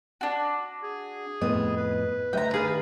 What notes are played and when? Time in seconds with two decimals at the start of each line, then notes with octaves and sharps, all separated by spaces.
0.21 D4 F#4
0.83 G#4
1.41 F2 A2 B3 D#5
1.77 B4
2.33 D2 D#5 E5 G5 A#5
2.54 D#3 D4 G#4 B4 F5